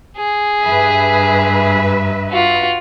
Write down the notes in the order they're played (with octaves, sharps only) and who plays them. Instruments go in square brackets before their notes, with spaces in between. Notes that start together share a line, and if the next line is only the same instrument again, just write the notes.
[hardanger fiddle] G#4
[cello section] G2 B4 E5
[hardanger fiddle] F4 F#4